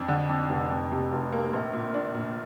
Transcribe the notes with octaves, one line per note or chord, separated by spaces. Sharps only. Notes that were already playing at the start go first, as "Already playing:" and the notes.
Already playing: F2 D4
D3
F2
F1
F2
C3
F1
A#3
A#1
A#2
D4
A#2